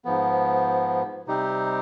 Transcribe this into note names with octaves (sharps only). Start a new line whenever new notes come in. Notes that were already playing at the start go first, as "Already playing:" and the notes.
G#2 F3 B3
C3 G3 C4 D#4 G4